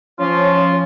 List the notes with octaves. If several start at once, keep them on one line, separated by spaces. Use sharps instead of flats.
F3 C#4 F4 C#5